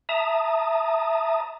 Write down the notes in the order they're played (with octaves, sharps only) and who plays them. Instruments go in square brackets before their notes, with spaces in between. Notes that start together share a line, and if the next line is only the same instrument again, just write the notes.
[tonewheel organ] E5 A5 A#5 D#6